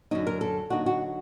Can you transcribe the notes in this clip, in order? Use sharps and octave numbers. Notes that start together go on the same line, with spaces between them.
F#2 D3 F#3 D#4
A#4
A4
D3 F#3 A#3 D#4 F#4
F#4